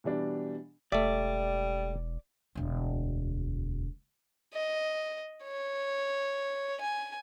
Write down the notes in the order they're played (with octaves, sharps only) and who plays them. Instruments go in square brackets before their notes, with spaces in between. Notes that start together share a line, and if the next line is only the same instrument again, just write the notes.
[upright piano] B2 E3 G3 D4
[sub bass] E1 [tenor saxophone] G3 [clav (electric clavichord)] A3 E5 [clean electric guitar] D5
[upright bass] E1 D2
[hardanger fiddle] D#5
C#5
G#5